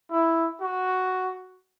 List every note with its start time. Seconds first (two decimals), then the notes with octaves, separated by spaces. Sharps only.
0.11 E4
0.61 F#4